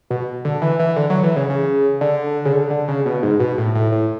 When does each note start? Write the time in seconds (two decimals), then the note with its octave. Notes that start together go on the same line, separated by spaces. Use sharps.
0.10 B2
0.45 D3
0.62 E3
0.79 E3
0.96 D3
1.10 F#3
1.23 E3
1.36 C#3
1.50 C#3
2.01 D3
2.45 C#3
2.53 D3
2.70 D3
2.88 C#3
3.06 B2
3.23 G#2
3.40 B2
3.58 A2
3.75 A2
3.92 A2